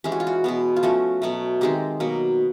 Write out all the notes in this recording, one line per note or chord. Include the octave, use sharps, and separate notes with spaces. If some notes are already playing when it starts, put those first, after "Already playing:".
E3 G#3 C#4 G4
F#4
F4
F#4
B2 G#3 B3
F4
F3 A3 C#4 F#4
B2 F#3 A3
D#3 G#3 C4 D#4 G4
B2 F#3 A#3